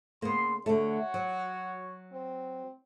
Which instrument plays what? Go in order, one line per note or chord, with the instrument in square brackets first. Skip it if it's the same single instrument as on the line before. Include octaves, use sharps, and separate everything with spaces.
[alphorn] C#3 [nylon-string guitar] A#3 B3 [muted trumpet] C6
[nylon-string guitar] D3 A3 [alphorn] F#4 [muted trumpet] C#5
[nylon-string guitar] F#3
[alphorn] C4